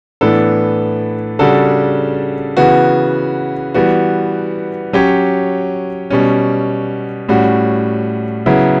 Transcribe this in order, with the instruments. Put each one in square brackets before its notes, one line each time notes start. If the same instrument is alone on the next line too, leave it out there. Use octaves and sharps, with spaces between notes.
[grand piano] A2 E3 B3 D4 A4
C#3 G3 D4 F#4 A4
C#3 E3 B3 F#4
E3 G3 B3 F#4
F#3 C#4 G4 C#5
B2 G3 C#4
A2 G3 C#4 F#4
C#3 F#3 B3 E4